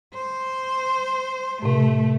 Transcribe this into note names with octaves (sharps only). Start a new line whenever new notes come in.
C5
A2 C3 A3